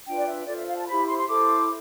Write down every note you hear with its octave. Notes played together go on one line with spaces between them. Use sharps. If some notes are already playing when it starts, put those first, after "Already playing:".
D4 F4 B4 G5
D5
E5
F4 A4 C5 D5
E5
F5
A5
E4 G4 C5 B5
C6
C6
E4 A4 C5 D6